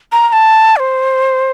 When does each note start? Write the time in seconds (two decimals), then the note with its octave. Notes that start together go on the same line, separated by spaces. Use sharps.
0.12 A#5
0.29 A#5
0.32 A5
0.76 D5
0.79 C5